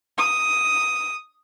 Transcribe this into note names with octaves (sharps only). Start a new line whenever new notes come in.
D#6